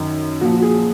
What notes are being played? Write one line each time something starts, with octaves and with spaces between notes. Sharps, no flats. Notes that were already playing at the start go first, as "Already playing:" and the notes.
Already playing: F#2 D#3
A#2 F3 F#4
F#4
G#4